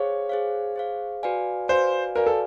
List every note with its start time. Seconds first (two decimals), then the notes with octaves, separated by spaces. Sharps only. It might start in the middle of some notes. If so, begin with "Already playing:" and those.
Already playing: G#4 C5 C#5 F5
0.29 G#4 C5 F5
0.76 G#4 C5 F5
1.23 F#4 B4 D5 F5 G#5
1.68 F#4 B4 C5 D5 F5 G#5
2.15 F#4 A#4 B4 D5 F5 G#5
2.26 A4